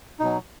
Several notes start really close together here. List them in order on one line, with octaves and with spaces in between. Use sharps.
D#4 B2 F#3